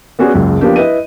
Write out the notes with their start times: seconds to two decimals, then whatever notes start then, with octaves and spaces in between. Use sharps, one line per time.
0.19 B3 C#4 F#4 G#4 D5
0.34 F#1 C#2 F#2
0.61 F3 A#3 B3 D4 G4
0.76 E4 B4 D#5 D#7